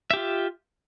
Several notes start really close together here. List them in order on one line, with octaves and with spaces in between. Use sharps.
E5 G4 F4